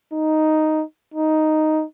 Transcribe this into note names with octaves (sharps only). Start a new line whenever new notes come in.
D#4
D#4